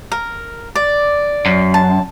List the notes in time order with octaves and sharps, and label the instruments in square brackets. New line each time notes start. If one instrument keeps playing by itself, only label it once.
[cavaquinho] A#4
D5
[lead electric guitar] F#2
[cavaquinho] A5